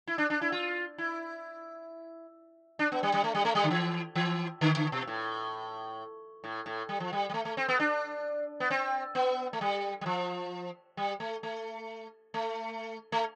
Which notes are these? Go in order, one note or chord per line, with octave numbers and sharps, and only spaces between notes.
E4
D4
D4
E4
F4
E4
D4
B3
G3
G3
A3
G3
A3
G3
D3
E3
E3
D3
D3
B2
A2
A2
A2
G3
F3
G3
G3
A3
A3
C4
B3
D4
B3
C4
B3
A3
G3
G3
F3
G3
A3
A3
A3
A3